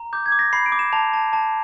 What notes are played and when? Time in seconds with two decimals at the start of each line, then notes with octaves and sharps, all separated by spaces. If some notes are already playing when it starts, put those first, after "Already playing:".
Already playing: A#5
0.13 D6 G6
0.26 G#6
0.32 D6
0.39 A#6
0.53 B5 C7
0.66 D7
0.72 D6
0.79 E7
0.93 A5 F7
1.13 A5
1.33 A5